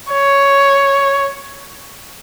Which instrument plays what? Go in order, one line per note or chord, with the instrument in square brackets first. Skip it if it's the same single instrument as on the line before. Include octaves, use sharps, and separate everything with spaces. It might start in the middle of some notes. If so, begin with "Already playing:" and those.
[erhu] C#5